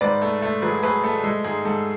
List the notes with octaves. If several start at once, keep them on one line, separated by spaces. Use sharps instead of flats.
G#2 B4 D5
A3
A3
F#3 G#4 B4
A3 G#4 B4
A3 A4
G#3 A4
G#2 G#4
G#2 A4